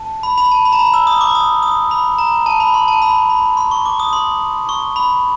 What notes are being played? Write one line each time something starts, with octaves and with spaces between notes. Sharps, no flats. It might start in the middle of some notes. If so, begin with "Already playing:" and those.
Already playing: A5
B5
B5
A5
B5
A#5
B5
E6
D#6
D6
D#6
D#6
B5
A#5
A5
B5
C6
A5
B5
B5
C6
C#6
D6
D#6
C6
C#6
B5